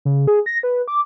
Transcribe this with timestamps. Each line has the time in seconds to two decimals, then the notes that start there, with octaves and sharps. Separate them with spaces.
0.05 C#3
0.27 G#4
0.46 A#6
0.63 B4
0.88 D6